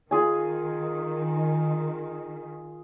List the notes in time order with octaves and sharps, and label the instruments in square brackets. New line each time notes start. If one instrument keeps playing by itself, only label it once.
[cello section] D#3 [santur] F4 G#4 G#5